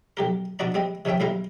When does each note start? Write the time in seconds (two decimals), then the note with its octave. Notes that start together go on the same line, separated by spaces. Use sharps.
0.17 B1 G4 A#4
0.59 B2 D4 F#4 D5 A#5
0.74 G3 C4 D#5
1.05 C3 D#3 C#4 E5 G5
1.20 B1 G3 E4 C5 F5 A#5